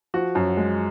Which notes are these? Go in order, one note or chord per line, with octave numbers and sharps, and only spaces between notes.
F3 F#4
F#2
G#3